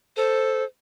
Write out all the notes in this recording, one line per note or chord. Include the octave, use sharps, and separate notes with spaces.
A4 C5